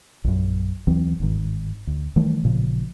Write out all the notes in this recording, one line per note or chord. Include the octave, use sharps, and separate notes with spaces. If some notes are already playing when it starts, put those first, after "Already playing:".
A#1 F#2
D#2 E3 F#3 C4
G1 G#2 D#3
D2
D#3 E3 G3 A3
A1 A#2 C#3 F3